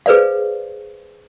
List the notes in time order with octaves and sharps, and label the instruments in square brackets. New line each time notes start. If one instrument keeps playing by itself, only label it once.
[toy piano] G#4 B4 C5 D5 F5